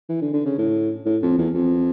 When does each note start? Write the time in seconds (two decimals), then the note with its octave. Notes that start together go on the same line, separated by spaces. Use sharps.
0.09 E3
0.21 D3
0.33 D3
0.45 C#3
0.58 A2
1.05 A2
1.22 F2
1.38 E2
1.54 F2